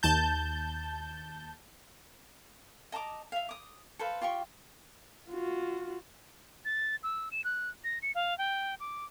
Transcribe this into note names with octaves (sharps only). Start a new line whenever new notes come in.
D#2 A5 G6
D#5 A5 A#5 D6
E5 F5
D6 D#6
A4 B4 C5 F5
F4 G4 C6 C#6
F4 F#4
A6
E6
E7
F#6
A#6
C#7
F5
G5
D6